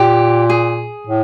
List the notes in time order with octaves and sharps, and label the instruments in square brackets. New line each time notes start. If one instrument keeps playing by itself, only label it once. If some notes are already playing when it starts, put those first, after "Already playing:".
Already playing: [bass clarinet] A#2 [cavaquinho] G4
[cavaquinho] G#4
[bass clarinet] A2